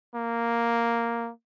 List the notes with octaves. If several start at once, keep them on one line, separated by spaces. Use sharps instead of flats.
A#3